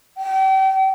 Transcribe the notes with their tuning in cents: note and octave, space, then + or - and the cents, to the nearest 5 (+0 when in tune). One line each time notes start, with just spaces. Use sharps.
G5 -40